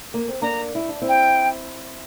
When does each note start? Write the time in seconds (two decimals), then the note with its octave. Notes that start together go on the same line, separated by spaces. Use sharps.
0.14 A#3
0.28 C4
0.42 A#3 D4 A#5
0.75 E4
0.88 D4
1.02 C4 E4
1.08 G5